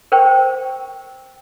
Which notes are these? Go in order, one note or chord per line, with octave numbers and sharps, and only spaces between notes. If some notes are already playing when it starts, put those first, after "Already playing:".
A#4 C5 G5 C#6